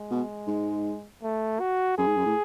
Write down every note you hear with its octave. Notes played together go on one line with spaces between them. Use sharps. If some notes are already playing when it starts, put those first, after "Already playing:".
Already playing: G#3
B2
G#2
A3
F#4
F#2 G#4
G#2
F#2
A2